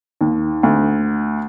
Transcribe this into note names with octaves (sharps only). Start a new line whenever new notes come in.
D#2
D2